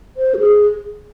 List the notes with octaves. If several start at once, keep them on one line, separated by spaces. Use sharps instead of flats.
C5
F#4
G#4